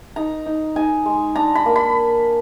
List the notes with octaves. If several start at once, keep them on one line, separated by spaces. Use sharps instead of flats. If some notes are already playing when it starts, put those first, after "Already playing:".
D#4 A#5
D#4
D#4 G#5
G#3
D4 A#5
B5
A#3
B5